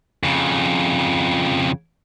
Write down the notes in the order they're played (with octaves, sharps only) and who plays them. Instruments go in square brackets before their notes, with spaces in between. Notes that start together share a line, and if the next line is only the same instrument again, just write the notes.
[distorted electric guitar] F2 C#3